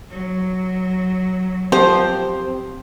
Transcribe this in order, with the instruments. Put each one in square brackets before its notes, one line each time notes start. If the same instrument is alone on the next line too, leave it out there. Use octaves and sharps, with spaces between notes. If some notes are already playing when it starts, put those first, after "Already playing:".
[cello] F#3
[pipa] F3 C5 [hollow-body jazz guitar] C4 G4